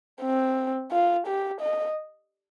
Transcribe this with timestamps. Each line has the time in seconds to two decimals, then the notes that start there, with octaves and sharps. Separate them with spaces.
0.21 C4
0.92 F4
1.27 G4
1.61 D#5